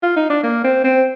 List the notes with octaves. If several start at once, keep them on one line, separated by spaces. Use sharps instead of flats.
F4
D#4
D4
A#3
C4
C4